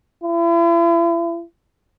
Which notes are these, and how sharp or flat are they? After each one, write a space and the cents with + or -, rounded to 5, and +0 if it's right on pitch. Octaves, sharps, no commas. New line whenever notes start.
E4 +40